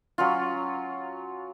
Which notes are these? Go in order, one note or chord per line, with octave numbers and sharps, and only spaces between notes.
F#3 C#4 F4